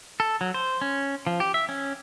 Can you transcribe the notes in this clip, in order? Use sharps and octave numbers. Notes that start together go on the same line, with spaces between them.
A4
F#3
C5
C#4
F3
G4
E5
C#4